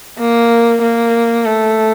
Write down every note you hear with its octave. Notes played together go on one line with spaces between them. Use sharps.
A#3
A#3
A3